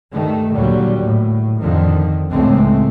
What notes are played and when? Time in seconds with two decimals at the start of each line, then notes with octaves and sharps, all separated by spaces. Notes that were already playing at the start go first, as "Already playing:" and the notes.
0.13 G2 D#3 A3
0.54 D#2 A#2 D3 F#3 G3
1.06 A2
1.61 F2 D3 D#3 F3
2.31 C#2 A2 C#3 G#3 A3 C4